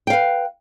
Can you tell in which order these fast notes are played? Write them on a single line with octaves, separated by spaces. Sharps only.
G5 F5 B4